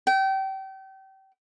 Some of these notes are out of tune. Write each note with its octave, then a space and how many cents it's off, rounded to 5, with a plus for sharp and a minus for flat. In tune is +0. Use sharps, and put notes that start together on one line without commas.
G5 -30